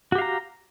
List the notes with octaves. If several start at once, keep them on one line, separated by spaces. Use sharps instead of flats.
F#4 G4 F5 A#5